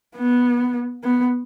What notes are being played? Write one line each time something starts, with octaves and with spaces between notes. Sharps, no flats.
B3
B3